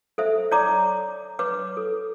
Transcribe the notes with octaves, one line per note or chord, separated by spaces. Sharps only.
A4 C5 E5
C#5 D5 A#5 D6
B4 C#5 D6
A4